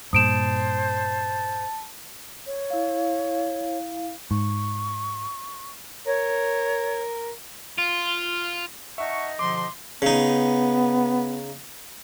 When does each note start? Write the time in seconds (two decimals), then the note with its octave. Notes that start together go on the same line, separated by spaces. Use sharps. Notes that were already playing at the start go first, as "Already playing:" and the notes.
0.13 G2 A#2 C5 A5 D#6 D7 E7
2.46 C#5
2.70 E4 F5
4.31 G#2 C#6
6.06 A#4 C#5
7.78 F4
8.98 D#4 E5 F#5 A5 C#6
9.39 B2 D3 F3 C6 D6
10.02 C#3 B3 D#4